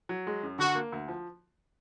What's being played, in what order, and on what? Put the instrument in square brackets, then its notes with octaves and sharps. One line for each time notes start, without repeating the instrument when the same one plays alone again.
[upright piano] F#3
G#3
F#2
[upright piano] D3 [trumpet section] F#4
[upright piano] A#3
D2
F3